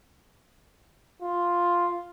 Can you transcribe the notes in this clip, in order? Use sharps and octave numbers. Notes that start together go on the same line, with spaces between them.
F4